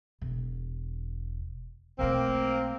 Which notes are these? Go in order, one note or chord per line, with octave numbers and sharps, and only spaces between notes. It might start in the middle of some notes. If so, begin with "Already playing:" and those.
E1
B1 A3 A#3 C4